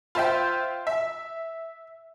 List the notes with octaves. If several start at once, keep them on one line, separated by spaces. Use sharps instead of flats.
F4 C5 E5 G5
E5